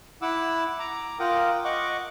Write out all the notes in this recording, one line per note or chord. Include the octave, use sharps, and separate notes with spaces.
E4 F#5 D6 E6
A#5 D6
F4 A#4 F#5 G5 D6 D#6
D#5 F#5 C#6 D6